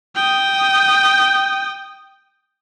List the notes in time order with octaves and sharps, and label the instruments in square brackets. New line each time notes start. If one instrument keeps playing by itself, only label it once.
[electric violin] G5 D#6